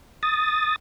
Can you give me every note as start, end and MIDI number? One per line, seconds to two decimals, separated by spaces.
0.23 0.76 87
0.23 0.76 93